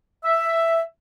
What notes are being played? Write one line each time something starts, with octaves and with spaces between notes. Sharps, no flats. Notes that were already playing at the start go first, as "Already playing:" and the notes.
E5